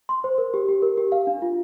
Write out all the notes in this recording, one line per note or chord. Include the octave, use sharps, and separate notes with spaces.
C6
C5
A#4
G4
G4
A#4
G4
F5
D4
F4